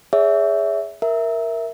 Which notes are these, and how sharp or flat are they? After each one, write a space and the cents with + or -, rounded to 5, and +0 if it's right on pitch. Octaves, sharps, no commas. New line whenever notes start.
G#4 +0 C#5 +35 E5 -5
A#4 +0 E5 +0